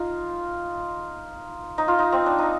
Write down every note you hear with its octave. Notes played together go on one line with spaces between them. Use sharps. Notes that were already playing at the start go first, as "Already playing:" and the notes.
Already playing: D#4 F4
D#4
F4
D#4
C4
D4
D#4